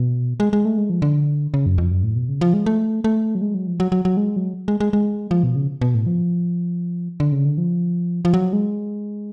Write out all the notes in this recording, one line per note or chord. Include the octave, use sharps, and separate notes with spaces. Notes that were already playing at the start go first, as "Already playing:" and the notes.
Already playing: B2
G#3
G#3
A3
G#3
F3
D3
C#3
F#2
F2
F#2
A2
B2
C#3
F3
G#3
A3
A3
F#3
G#3
F#3
F3
F#3
F#3
F#3
G#3
F#3
G#3
G#3
G#3
F3
B2
C#3
B2
A2
F3
D3
C#3
D3
F3
F3
F#3
G#3